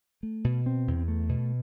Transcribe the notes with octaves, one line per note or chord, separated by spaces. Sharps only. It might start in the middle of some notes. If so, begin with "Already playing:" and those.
A3
B2
C4
E2
A3
B2